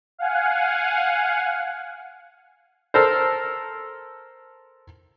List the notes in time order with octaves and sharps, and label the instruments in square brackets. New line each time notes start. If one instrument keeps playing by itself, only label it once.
[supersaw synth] F5 F#5 G#5
[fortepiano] A4 A#4 C5